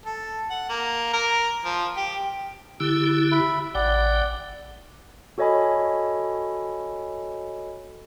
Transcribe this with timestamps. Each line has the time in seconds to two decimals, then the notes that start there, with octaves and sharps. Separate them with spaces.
0.06 A4
0.50 F#5
0.69 A#3
1.13 A#4
1.65 F3
1.97 G4
2.80 D3 E4 G4 E6
3.32 E5 B5
3.75 A1 D5 F#5 G5
5.38 F#4 A4 C#5 D#5 G#5 B5